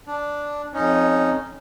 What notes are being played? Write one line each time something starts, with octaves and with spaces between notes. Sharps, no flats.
D4
F2 C#4 D#4